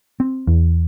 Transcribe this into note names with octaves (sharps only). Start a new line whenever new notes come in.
C4
E2